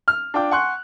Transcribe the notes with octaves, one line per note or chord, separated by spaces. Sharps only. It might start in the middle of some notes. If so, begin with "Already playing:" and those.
F6
D4 F4 G5 D6
F#5 G#5 C6 C#6 F#6